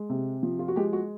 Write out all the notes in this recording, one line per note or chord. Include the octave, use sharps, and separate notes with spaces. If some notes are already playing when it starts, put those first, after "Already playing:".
Already playing: G#3
C3
F3
F4
F#4
G#3 G4
F#4